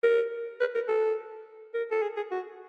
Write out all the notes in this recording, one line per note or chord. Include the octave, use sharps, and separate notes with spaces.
A#4
B4
A#4
A4
A#4
A4
G#4
G#4
F#4